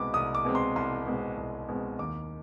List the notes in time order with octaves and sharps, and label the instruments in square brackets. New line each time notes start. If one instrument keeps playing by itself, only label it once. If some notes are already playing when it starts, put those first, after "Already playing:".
Already playing: [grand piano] C2 B2 G#3 C4 B5 D6
C2 D#6
D6
B2 G#3 C4
C6
C2 C6
B2 G#3 C4
C2
B2 G#3 C4
D#2 D6